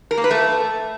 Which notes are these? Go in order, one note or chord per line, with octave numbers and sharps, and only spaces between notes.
A#4
A#3
B4
A3